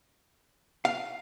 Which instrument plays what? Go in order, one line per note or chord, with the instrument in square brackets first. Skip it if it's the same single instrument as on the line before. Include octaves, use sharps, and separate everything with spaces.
[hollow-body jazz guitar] F5